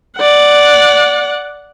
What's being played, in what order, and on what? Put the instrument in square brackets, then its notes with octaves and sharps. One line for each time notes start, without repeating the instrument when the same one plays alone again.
[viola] D5 F#5